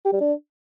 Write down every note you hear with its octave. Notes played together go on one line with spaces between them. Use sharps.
G4
G3
D4